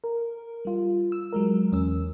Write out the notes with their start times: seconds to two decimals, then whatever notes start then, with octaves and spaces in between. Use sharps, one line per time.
0.04 A#4
0.65 G3 F4
1.12 E6
1.33 F#3 G#3 A#4
1.72 E2 C#4 E6